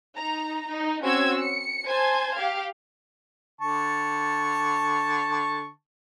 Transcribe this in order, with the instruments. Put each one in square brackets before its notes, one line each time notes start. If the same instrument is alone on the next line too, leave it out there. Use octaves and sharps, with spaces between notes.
[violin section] D#4 A#5
D#4
C4 C#4 F#4 E6 G#6
C#7
C5 G#5 A5 G#6
G4 F5
[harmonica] D3 A5 C#6